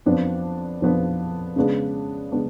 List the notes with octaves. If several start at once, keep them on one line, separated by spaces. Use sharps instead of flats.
F2 F3 B3 D4
F2 F3 B3 D4
C#3 G#3 B3 D4
C#3 G#3 B3 D4